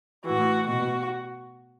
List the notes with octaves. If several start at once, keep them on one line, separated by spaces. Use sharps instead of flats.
A2 E3 F#4
B2 F#4